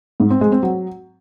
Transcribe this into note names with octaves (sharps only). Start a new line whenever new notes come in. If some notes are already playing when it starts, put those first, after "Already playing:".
G#2
C4
G#3
C4
F#3